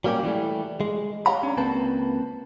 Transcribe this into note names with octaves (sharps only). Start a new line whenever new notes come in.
F#3 G3 A#3 C#4 G4
E3 F#3 G3 A3
G#3
G4 C#5 F5 F#5 A#5 B5
C#4 D4
C#2 A#3 C4 B4 A5